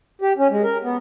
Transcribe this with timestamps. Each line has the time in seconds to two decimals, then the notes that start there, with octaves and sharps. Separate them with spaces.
0.22 G4
0.38 C#4
0.51 G#3
0.63 A#4
0.83 B3